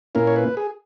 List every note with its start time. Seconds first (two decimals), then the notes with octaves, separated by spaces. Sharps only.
0.15 A#2 A#3 C#4 E4 A#4
0.27 C#5
0.36 B4
0.57 G#4